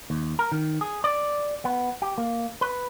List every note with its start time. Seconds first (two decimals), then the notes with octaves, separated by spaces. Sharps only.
0.10 D#2
0.39 A#4
0.52 D#3
0.81 G#4
1.04 D5
1.65 B3
2.02 G4
2.18 A#3
2.61 B4